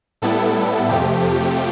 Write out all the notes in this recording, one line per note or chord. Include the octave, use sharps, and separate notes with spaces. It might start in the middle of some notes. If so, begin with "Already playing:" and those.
A2 G3 B3 E4 A4
F2 C3 F3 A3 G4